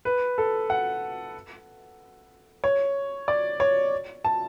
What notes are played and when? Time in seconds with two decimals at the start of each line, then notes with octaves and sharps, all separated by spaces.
0.05 B4
0.38 A4
0.70 F#5
2.64 C#5
3.28 D5
3.60 C#5
4.25 A5